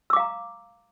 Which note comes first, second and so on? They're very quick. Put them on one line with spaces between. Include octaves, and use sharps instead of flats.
E6 D6 F5 A#5